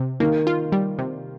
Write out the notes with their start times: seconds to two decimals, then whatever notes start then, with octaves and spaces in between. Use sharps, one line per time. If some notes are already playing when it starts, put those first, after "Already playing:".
Already playing: C3
0.20 D#3 A#3
0.47 F4
0.72 G3
0.99 C3